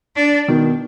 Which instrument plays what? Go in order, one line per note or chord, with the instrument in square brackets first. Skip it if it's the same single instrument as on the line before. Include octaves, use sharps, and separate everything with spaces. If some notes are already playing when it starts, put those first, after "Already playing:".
[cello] D4
[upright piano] B2 D#3